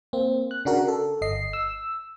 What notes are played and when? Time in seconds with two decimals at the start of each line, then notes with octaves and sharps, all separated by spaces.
0.13 A#3 C4
0.51 F#6
0.65 C#3 D4 F#4 A#4
0.88 A4
1.22 G1 D#5 C7
1.53 E6